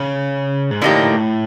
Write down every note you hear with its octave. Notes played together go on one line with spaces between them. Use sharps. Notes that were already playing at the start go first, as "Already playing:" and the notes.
Already playing: C#3
G#2
A2 D3 F3 A#3 D#4 G4